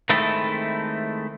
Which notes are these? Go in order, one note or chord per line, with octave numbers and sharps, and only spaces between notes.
D#3 G#3 A3 C4 E4 A4